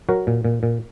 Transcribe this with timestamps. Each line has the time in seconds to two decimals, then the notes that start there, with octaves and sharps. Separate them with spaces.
0.09 F#3 F#4 A#4
0.27 A#2
0.45 A#2
0.63 A#2